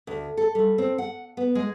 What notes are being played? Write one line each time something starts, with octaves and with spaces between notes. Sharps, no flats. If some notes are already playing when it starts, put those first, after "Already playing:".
D2
A4
G3
C4
F#5
B3
G#3